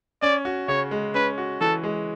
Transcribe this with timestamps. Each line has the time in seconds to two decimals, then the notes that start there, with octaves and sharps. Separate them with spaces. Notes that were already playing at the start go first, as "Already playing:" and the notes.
0.22 C#4 D5
0.45 F#4
0.68 C#3 C#5
0.91 G#3
1.14 C#4 B4
1.38 F#4
1.60 E3 A4
1.83 G#3